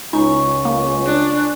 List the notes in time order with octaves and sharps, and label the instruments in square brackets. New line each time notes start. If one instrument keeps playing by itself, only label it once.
[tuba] C#2 [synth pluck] D#4 [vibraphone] G#5 C#6
[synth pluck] A#3
[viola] D4